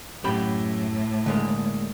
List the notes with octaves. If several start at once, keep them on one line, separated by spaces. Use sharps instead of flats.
F#2 A2 G4 B5
D3 G#3 A#3